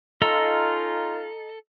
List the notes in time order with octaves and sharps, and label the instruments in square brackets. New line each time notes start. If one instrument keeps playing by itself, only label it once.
[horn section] C#4 D#4 F4 [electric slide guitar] A4 [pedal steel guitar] D#5 A#5 E6